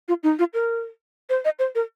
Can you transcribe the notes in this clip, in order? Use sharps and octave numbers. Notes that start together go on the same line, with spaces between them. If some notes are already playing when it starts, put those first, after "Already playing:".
F4
D#4
F4
A#4
C5
D#5
C5
A#4